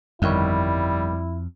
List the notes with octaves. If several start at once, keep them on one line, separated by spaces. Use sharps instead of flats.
G1 F2 D#3 G3 E4 C#5